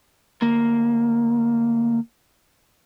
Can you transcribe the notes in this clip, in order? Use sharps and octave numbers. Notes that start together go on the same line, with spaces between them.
D2 A#3